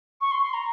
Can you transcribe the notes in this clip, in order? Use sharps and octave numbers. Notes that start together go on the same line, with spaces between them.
C#6
C6
C6
A#5